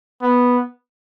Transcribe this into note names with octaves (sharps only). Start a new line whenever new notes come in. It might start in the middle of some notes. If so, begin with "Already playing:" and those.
B3